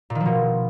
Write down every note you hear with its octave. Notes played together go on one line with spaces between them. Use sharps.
A#2
D#3
F3
B2